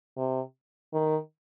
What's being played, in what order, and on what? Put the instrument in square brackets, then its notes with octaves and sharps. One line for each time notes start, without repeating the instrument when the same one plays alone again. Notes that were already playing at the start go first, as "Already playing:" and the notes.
[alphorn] C3
D#3